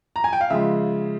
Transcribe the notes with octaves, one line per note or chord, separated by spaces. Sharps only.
A#5
G#5
G5
F5
C#3 F3 G#3 E5